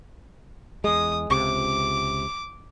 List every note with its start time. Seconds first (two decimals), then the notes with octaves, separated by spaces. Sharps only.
0.84 E2 G#3 D#6
1.30 C#2 C3 D6